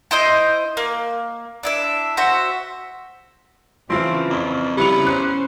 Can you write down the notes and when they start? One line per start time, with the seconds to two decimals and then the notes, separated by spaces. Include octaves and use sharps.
0.11 E4 C5 D#5 G6
0.77 A#3
1.63 D4 E4 E5
2.17 F#4 C5 E5
3.90 C#3 E3 F3 C4 E4 F4
4.30 F2
4.77 C#3 G3 B3 E4 F7
5.06 C#4 C5 F#6